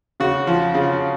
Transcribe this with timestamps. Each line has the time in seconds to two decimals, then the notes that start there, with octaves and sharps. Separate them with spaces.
0.20 C#3 F#4
0.47 F3
0.74 C#3